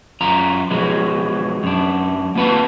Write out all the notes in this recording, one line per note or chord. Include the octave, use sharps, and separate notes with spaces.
F#2 F4 A#5
B2 F3 F#3 G#3
F#2 D4
A#3 C4 F4 B4 F#5 A5